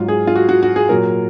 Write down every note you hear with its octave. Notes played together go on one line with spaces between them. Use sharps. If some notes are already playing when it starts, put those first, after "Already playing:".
Already playing: G#2 F#3 F4
G#4
F4
F#4
F#4
F#4
G#4
A#2 F#3 A#4